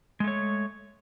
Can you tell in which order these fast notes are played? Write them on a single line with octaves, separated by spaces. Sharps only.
G#3 A3 C#5